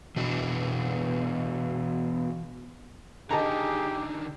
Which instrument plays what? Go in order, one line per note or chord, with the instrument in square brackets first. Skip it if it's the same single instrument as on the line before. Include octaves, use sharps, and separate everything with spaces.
[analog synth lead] B2 [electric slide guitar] E3 D4 F#4
[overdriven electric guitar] D3 D#3 [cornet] G4 [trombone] G#4 [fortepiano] D#5 A5 A#5